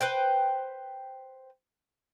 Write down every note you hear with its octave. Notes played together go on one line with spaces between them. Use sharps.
B4 C5 G5